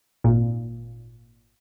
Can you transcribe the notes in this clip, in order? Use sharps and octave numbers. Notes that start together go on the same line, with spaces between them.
G#1 A#2